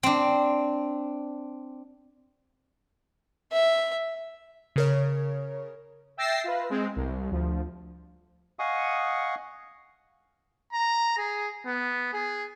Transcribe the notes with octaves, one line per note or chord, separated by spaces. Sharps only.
C4 D4
E5
C#3 A#4 C#5
E5 G5 E6 A6 A#6 C7
F4 B4
G#3 C4
C2
D2 F3
D#5 F5 F#5 G#5 C#6 D#6
A#5
G#4
B3
G#4